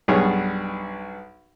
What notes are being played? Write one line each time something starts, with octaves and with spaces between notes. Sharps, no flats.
B1 G2 B3 G#4 C#5